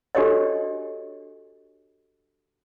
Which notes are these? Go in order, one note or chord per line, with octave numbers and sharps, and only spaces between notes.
D4 F#4 G4 A4 C#5 D#5